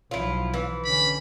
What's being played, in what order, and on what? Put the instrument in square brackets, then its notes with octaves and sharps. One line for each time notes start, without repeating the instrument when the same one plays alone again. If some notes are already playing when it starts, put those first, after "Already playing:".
[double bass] B1 F3 [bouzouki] E4 F4
[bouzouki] E3
[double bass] D3 C#4 [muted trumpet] B5